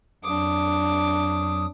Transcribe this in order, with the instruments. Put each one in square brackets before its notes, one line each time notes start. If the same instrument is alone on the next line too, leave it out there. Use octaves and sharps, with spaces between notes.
[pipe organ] F2 F#3 D#6 [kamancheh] D4 D6